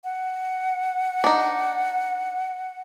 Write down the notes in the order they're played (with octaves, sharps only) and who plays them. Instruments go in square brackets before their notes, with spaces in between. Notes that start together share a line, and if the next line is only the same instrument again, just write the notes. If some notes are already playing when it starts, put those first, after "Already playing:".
[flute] F#5
[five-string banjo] D4 D#4